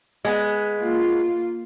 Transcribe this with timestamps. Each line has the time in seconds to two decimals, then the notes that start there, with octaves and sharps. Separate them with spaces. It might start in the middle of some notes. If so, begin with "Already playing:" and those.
0.25 G#3 B3
0.80 A#3 F4